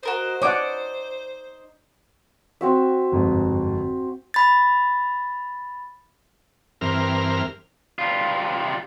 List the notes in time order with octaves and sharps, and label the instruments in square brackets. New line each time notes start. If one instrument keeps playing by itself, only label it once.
[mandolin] F#4 A#4 D#5 [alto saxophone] C5
[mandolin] D#4 D6 [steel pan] C#5 D5 F#5
[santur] C4 F#4 E5
[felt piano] G1 F2 G#2
[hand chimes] B5 A6
[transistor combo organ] G2 E3 C4 A#4 F6
[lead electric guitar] G3 F4